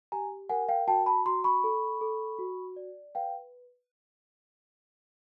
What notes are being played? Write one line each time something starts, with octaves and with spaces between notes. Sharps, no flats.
G4 G#5 A#5
A#4 F#5 G#5
F5 G5
F#4 G5 A5
A5 B5
F#4 A#5 C6
B5 C#6
A4
A4
F#4
D5
B4 F5 G5